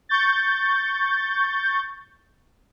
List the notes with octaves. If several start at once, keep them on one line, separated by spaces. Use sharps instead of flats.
C#6 G6 A6